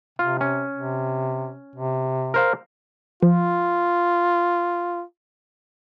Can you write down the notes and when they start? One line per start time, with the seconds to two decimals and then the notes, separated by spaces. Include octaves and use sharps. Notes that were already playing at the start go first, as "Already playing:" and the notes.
0.19 C3 F4
0.41 C#4
0.75 C3
1.76 C3
2.34 A#4 C5 F5
3.23 F3 F4